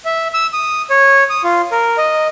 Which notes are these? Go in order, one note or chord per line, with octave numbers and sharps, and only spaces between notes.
E5
E6
D#6
C#5
D#6
F4
A#4
D#5